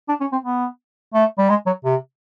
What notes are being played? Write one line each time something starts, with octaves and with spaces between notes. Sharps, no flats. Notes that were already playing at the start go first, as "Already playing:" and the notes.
D4
C#4
C4
B3
A3
G3
G#3
F#3
C3